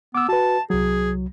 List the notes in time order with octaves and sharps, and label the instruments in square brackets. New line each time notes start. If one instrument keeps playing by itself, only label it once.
[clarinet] B3 [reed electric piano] D6 E6
[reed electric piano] F#4 B4 [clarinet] A5
[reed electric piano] C2 F#3 [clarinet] G#4